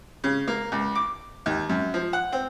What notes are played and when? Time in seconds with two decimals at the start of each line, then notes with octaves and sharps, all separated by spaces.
0.24 C#3
0.48 A#3
0.72 C#2
0.95 D6
1.46 D#2
1.69 F#2
1.94 F3
2.13 F#5
2.32 C4